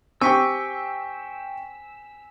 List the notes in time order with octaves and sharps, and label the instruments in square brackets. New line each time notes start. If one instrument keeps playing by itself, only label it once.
[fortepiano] C4 G4 [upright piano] G5 C#6 [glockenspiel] G#5 B6 [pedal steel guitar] E6